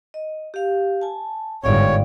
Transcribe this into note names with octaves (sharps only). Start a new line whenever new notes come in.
D#5
G4 F5
G#5 A5
G1 G#2 C#5 D5 F5 G5